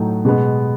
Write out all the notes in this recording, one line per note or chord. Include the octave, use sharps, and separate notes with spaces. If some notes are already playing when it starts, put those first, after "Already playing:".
Already playing: A2 F#3 A3 D#4
B2 G#3 B3